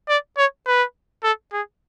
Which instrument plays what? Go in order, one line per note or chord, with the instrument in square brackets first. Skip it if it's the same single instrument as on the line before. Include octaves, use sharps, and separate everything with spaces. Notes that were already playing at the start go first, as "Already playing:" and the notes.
[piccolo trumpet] D5
C#5
B4
A4
G#4